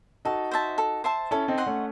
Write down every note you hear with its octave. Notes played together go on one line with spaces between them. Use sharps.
D#4 F#4 A4
C5 E5 A5
A4
C5 E5 A5
C#4 E4 A4
C4 D#4
D#5 F#5 C6
A3 C#4